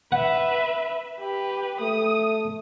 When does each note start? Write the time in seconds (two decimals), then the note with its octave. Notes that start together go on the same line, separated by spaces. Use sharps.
0.12 B4 E5 F#5
1.20 G4 B4
1.81 A3 D#6